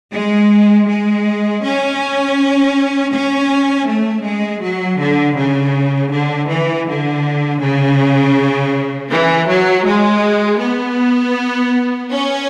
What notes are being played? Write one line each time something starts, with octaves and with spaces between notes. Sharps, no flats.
G#3
G#3
C#4
C#4
A3
G#3
F#3
D3
C#3
D3
E3
D3
C#3
E3
F#3
G#3
B3
C#4